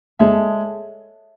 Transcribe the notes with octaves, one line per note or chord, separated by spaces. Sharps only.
G#3 A4 C#5 E5 A5